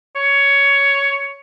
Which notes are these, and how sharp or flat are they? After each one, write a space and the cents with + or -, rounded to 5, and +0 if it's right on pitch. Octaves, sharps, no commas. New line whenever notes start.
C#5 +10